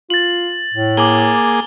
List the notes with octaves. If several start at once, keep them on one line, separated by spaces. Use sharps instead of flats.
F4 A6 F#7
A2
A#3 G#4 D6 F#7 G7